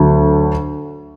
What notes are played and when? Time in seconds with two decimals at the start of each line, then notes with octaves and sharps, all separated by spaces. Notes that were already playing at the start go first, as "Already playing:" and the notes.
Already playing: D2 D3 F#3